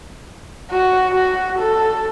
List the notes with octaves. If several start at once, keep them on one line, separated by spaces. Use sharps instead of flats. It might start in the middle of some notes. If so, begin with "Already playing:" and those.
F#4
F#4
A4